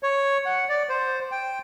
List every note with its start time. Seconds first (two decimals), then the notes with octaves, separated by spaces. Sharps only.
0.03 C#5
0.45 F#5
0.69 D5
0.89 C5
1.32 G5